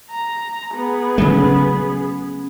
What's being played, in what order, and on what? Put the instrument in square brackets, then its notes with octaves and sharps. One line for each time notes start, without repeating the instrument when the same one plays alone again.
[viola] A#5
B3 G#4
[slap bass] C#3 F#3 A3